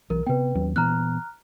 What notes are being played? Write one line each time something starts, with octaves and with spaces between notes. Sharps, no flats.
B1 E3 A#4
C3 B3 B4 G5
D#2 F#3 C#4
A#2 E3 B3 A#5 F6 F#6